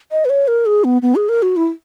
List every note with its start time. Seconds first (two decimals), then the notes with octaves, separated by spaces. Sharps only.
0.12 D#5
0.25 B4
0.30 C#5
0.48 A#4
0.66 G#4
0.84 B3
1.02 B3
1.15 G#4
1.29 A#4
1.42 F#4
1.56 E4